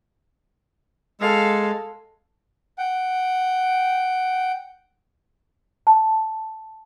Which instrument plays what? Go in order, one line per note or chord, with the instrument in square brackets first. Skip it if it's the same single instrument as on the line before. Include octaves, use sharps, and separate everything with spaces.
[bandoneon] G#3 [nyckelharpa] A4 F5
[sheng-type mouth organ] F#5 G5
[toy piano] A5